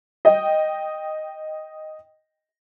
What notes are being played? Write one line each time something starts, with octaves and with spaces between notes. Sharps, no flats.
D#5 G5